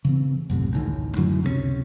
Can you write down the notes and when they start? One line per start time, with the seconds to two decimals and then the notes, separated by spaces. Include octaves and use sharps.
0.05 C#3 E3 C4
0.50 C2 F#2 A2 C3
0.73 A1 D2 A2 D#3
1.17 F#2 D3 E3 F#3
1.43 C#2 C3 G#3 C#4